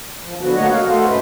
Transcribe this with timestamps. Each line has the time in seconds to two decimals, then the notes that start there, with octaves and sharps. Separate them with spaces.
0.24 F3
0.41 D3 F#3 B3 F#4
0.56 A3 A#3 C#5 D#5 F#5
0.71 F5
0.87 A3 F#4 A4 C5
1.07 G#2 C#4 B4 D#5